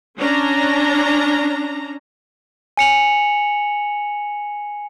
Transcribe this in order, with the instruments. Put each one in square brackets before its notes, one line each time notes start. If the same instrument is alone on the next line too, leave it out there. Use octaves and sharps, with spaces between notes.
[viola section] C#4 D4 A#5
[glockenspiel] G#5 C#7 F7 F#7